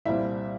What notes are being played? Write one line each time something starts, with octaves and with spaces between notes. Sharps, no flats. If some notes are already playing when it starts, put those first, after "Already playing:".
C2 A#2 G3 C4 E4 E5